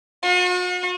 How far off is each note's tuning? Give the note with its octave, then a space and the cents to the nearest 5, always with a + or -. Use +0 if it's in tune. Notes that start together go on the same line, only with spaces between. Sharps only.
F#4 -45